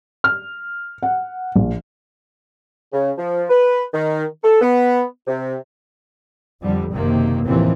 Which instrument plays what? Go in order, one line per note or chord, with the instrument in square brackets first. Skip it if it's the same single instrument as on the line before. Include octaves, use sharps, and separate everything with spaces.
[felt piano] F6
F#5
A#1
[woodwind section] C#3
F3
B4
D#3
A4
B3
C3
[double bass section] F2 D3 G3
F#1 C3 D#3 A#3
A1 D#2 C3 E3 F3 C4